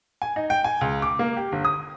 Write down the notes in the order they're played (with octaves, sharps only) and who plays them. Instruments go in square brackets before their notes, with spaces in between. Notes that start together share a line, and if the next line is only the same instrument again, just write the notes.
[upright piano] G#5
D#4
G5
G#5
C#2
D6
A#3
G4
G1
D#6